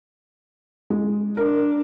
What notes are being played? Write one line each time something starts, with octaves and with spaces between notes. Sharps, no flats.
G#3
D4 A#4